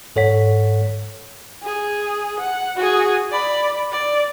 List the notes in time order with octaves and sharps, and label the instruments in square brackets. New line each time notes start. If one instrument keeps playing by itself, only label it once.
[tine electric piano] G#2 A4 C#5 F#5 B6
[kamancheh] G#4
F#5
F#4 G#4
D5 B5
D5